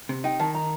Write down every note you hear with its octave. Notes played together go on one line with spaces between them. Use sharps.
C3
D#4 G5
D#3 A5
A#5